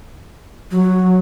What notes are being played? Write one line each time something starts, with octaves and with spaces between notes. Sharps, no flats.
F#3